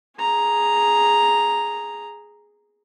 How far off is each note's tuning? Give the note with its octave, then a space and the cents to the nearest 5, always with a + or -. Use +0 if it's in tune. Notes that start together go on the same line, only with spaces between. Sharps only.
G#4 +0 A#5 +0